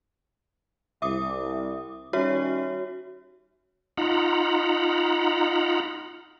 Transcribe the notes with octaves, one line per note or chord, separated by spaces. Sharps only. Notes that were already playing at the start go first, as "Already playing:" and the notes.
C2 E5 D6 D#6
D#3 G3 C#4 F#4 C#5 E5
D#4 F4 F#5 A#5 B5